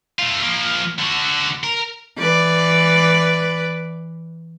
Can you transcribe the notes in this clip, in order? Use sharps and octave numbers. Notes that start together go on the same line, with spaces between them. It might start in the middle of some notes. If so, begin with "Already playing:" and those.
A3 F4
F3 A#3
D3 F#4
A#4
E3 B4 D5